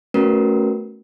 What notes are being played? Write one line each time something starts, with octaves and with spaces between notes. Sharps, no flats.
A3 B3 C#4 F#4 A#4 B4